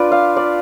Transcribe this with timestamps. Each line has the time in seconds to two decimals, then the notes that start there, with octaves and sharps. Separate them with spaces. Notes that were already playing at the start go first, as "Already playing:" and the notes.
Already playing: D4 F4 B4 D5
0.11 F5
0.37 D5